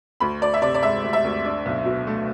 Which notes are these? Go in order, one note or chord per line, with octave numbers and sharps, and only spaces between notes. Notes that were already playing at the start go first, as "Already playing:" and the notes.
D2 B5
D2 D5
E5
C3 D5
D5
G#3 E5
D2
E5
D2
D4
B1
B2
A3